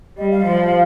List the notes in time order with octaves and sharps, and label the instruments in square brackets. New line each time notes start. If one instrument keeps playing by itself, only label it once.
[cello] G3 [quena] D#5
[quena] F5
[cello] F3